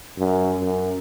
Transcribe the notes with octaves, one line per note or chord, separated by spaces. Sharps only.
F#2
F#2